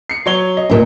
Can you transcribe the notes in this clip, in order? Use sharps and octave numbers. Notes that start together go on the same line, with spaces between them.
C7 C#7
F#3 C#5 G7
D#5
D2 A#2